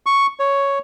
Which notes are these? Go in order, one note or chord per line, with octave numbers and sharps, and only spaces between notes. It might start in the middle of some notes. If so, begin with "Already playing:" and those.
C#6
C#5